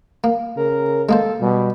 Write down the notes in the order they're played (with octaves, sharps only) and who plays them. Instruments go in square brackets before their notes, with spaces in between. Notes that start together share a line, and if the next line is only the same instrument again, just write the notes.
[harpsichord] A#3
[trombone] C#3 [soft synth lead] A#4
[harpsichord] G#3 A#3 C5 [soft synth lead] A4
[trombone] B2 [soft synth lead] G3